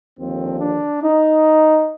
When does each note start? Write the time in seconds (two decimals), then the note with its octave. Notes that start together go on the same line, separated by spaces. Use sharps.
0.19 D#2 D3 F3 C4
0.60 D4
1.03 D#4